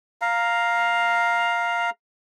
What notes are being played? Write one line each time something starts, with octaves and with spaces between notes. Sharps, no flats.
F5 A#5